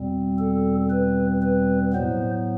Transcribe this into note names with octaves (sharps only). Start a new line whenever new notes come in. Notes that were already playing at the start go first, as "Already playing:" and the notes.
Already playing: E2 B2 G3 C4
A4
B4
B4
A2 F#3 B3 C5